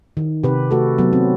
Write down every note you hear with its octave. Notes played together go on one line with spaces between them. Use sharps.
D#3
C3 G4 B4
A3 F#4 A4
F#3 B3
C4